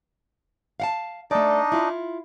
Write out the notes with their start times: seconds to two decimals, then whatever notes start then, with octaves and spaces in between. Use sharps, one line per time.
0.80 F5 F#5 A5
1.31 A3 D4 D#4 D5 D#5
1.72 E4 F4